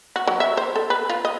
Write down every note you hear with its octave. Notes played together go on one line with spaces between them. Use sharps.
F#4
F#3
E5
C5
A4
B4
F4
D#5